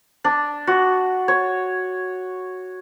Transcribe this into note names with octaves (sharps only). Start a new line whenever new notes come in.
D4
F#4
C#5